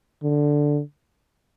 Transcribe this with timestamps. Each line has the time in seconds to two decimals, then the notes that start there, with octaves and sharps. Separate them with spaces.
0.23 D3